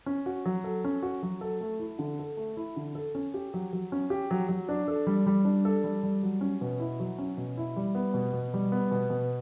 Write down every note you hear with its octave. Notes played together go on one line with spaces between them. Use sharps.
C#4
F#4
F#3
A4
C#4
F#4
F#3
A4
A3
E4
D3
A4
A3
E4
D3
A4
C#4
G4
F#3
F#3
C#4
G4
F#3
F#3
D4
A4
G3
G3
D4
A4
G3
G3
F#3
C#4
B2
E4
F#3
C#4
B2
E4
G3
B3
B2
B2
G3
B3
B2
B2